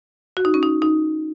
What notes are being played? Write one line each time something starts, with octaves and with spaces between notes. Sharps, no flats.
F#4
D#4
C#4
D#4
D#4